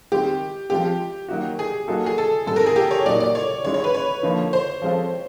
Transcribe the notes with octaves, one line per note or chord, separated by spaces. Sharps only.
D#3 G#3 C4 G4
F3 G#3 C4 F4 G4
D#3 F#3 A#3 D#4 F#4
G#4
F#3 A#3 D#4 F#4 A4
G#4
A4
G#2 D#3 G3 C4 A4
A#4
G#4
G4
C#5
A#2 F#3 A#3 D#4 D5
D5
C#5
D#3 G#3 C#4 E4 C#5
C#5
B4
C#5
D3 F3 A#3 D#4
C5
F3 G#3 C4 F4 A4